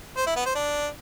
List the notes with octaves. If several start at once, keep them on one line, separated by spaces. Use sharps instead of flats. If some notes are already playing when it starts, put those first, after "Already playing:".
C5
E4
B3
C5
D4